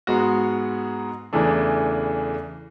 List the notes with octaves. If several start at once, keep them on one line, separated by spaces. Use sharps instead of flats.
G#2 G#3 B3 F#4
E2 C#3 E3 A3 D4